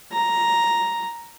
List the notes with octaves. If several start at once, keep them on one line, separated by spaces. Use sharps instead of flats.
A#5